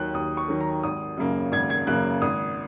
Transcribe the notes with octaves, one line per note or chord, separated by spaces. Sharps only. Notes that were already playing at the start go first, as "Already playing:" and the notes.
Already playing: D#2 D#3 F#3 F#6
D#2 D#6
C#6
D#3 F#3
A#5
G#1 D#6
F#2 C#3 A#3
G#1 G#6
G#6
F#2 C#3 A#3 F#6
G#1 D#6